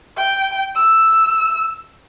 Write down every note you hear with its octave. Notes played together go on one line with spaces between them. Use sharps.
G5
E6